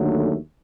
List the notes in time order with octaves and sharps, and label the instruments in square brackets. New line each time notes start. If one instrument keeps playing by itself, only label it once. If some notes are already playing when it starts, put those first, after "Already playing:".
Already playing: [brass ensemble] D#2 D3 F#3 A3